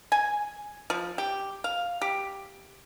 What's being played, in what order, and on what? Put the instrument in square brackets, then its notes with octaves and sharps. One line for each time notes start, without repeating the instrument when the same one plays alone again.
[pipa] G#5
F3
G4
F5
G4